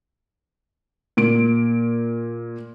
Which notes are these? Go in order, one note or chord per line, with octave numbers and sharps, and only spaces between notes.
A#2 D7